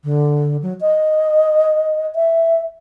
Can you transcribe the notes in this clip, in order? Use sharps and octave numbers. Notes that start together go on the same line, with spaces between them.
D3
F#3
D#5
E5